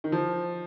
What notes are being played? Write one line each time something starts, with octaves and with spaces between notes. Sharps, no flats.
D#3
F3